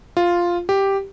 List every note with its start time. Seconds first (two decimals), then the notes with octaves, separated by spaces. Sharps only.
0.17 F4
0.69 G4